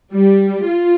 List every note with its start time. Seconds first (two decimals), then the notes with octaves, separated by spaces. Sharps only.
0.13 G3
0.67 F4